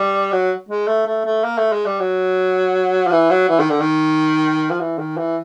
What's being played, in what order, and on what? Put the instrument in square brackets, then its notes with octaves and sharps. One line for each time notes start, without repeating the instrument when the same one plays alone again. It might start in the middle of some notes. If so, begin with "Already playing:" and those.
Already playing: [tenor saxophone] G3
F#3
G#3
A3
A3
A3
A#3
A3
G#3
G3
F#3
F3
E3
F#3
E3
D#3
D3
D#3
F3
E3
D#3
E3